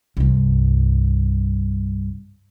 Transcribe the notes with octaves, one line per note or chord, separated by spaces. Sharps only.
C2 G2